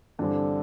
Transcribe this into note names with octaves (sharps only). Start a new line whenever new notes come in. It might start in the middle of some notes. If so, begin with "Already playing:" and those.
G2 D3 E3 G3 C4